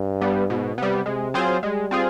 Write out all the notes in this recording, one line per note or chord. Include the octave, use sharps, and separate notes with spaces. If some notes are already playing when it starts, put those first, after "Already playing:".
Already playing: G2
G3 B3
G#2 B2
C3 G3 B3
C3 G#3
F#3 C4 F4 G#4 C5
G3 G#3
C4 F4 G#4